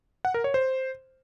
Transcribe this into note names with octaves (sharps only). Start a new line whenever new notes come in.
F#5
A#4
C#5
C5